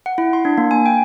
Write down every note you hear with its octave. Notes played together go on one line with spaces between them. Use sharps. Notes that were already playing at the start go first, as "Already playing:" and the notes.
F#5
E4
C6
D4
A#3
G#5
G5